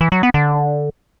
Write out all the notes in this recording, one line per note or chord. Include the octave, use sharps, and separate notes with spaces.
E3
F#3
B3
D3